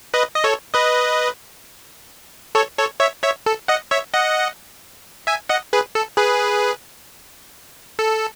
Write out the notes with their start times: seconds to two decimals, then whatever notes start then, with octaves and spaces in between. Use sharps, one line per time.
0.14 B4 D#5
0.34 D#5
0.44 A4 C#5
0.74 B4 D#5
2.55 A4 C#5
2.78 A4 C#5
3.00 C#5 E5
3.23 C#5 E5
3.46 A4
3.68 D#5 F#5
3.91 C#5 E5
4.14 D#5 F#5
5.27 E5 G#5
5.49 D#5 F#5
5.73 G#4 B4
5.95 A4
6.17 G#4 B4
7.99 A4